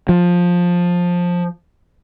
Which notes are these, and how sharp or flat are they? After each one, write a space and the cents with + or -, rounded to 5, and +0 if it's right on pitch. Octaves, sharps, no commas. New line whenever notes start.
F3 +15